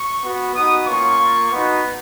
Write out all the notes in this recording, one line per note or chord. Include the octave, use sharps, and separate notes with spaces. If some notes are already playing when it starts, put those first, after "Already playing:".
Already playing: C#6
B3 F#4
B3 D#4 F#4 D#6
A#3 C#4 F4 C#6
A#3 F4
B3 D#4 F#4